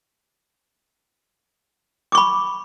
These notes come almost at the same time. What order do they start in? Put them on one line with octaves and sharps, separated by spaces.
D6 C#6 B5